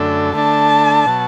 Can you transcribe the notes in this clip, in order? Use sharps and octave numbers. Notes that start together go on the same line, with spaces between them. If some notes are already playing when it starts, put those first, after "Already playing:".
Already playing: F#2 D3 A3 D4 A4
D3 A3 D4 A5
B2 F#3